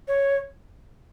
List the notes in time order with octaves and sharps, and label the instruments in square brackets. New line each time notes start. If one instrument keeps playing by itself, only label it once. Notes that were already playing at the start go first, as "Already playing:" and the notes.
[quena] C#5